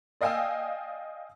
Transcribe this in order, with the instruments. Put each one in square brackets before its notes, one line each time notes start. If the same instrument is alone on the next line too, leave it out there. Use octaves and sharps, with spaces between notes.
[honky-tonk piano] D5 D#5 F5 G5 G#5 E6